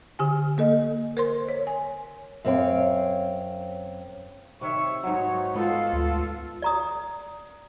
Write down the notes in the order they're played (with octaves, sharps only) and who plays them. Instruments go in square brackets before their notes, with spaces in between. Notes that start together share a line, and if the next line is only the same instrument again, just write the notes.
[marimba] D3 G4 G#5
A#3 A4 D#5
A#4 C5 C6
C#5
G#5
[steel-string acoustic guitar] F#2 C4 C#5 F5 G5
[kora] C3 D#3 [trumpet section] C#5 E5 C#6
[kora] G#2 F#3 [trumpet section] B3 D#4 C#5
[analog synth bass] G#3 [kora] B3 [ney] F4 [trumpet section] A4
[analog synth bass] D2
[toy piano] D5 A#5 D#6